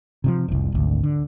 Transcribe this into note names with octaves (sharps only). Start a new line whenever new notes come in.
C3 D#3 F3
F1 C2
G#1 D2
D3